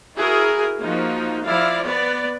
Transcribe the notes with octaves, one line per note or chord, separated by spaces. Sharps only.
E4 F#4 G#4 A#4
F3 A#3 D#4 F#4
F3 E4 D5 F5
B3 B4 D5